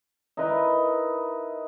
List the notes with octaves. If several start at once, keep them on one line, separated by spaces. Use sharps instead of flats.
D#4 E4 A#4 B4